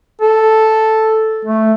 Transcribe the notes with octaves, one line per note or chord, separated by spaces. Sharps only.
A4
A3